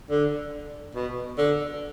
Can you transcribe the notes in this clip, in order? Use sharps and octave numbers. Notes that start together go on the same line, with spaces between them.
D3
B2
D3